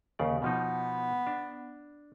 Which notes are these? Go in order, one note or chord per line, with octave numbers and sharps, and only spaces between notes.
D#2 C#3 D5
B2 F3 B3 D#4
D4